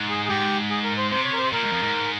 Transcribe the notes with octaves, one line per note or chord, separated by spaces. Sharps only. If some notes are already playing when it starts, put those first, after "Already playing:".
Already playing: G#2
G#4
G#4
G#2 G4
G#4
A#4
C5
C3 C5
C#5
A#4
C5
A#2 A#4
G#2
F2
G#2